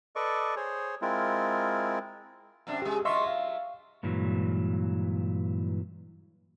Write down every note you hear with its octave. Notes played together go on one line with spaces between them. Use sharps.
A4 B4 D5 D#5 C#6 D6
G#4 C5 C#5
G#3 C4 E4 F4 A#4
F#2 C3 D4
C#3 G#3 G4 G#4
F#3 F4 D#5 E5 C6 C#6
F5
G2 A#2 E3 F#3 G#3